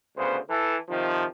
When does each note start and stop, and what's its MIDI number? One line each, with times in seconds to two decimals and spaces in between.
0.16 0.37 38
0.16 0.37 49
0.16 0.37 59
0.16 0.37 72
0.50 0.76 52
0.50 0.76 69
0.89 1.25 48
0.89 1.25 51
0.89 1.25 53